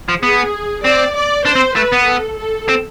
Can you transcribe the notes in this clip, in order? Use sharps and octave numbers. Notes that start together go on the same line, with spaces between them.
F3
B3 G#4
C4 D5
D5
D4 C5
C4
A3 B4
B3
A4
A4
C4